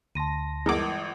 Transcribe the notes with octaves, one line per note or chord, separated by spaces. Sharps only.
D2 A5 C6 A#6 D#7
G1 E3 G#3 A#4 D6